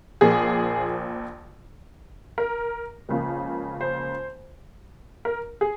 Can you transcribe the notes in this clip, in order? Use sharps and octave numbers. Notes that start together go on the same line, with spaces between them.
A#1 A#2 F3 G#4
A#4
C#2 C#3 F3 A#3
C5
A#4
G#4